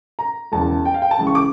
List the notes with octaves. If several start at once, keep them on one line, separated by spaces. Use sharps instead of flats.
A#5
E1 E2 C#3 E3 A5
G5
F5
G5
A5
C#2 C#3 E3
C#6
D6